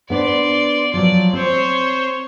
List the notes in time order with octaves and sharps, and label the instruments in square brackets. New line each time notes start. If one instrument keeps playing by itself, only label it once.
[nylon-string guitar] B3 D4 C5 [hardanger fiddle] D5 C6
[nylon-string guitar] F3 F#3 [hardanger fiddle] D5
[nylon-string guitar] C4 [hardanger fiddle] C5 C#5